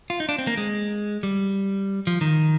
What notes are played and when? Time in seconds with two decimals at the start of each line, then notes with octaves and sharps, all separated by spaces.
0.10 F4
0.20 D#4
0.29 D4
0.39 C4
0.47 A#3
0.57 G#3
1.23 G3
2.07 F3
2.21 D#3